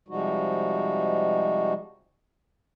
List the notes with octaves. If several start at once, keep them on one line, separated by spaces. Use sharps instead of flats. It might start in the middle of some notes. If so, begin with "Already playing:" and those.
C3 F3 G3 G#3 D#4 F#4